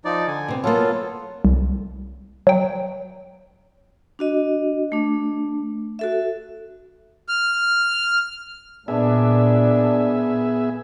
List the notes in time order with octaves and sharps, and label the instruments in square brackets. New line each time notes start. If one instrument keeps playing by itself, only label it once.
[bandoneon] F3 D#4 D5
D3 G#5
[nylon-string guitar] B2 C4
[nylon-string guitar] F#3 A#3 [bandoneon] B3 F4 A4
[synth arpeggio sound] C2
F#3 G5
[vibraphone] D4 F#4 D#5
A3 D4
F#4 A4 E5
[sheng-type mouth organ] F6
[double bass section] A#2 [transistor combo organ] B3 G#4 E5 [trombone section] D4